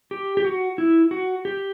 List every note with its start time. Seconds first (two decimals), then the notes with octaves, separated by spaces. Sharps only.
0.11 G4
0.37 G4
0.45 F#4
0.78 E4
1.11 F#4
1.45 G4